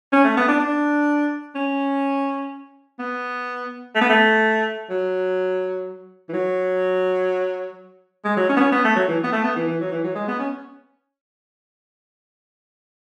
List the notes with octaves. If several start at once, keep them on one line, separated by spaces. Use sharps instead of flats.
C#4
A3
B3
D4
D4
C#4
B3
A3
B3
A3
F#3
E3
F#3
G#3
F#3
C#4
B3
C#4
B3
A3
F#3
E3
B3
A3
B3
E3
E3
F#3
E3
F#3
G#3
B3
C#4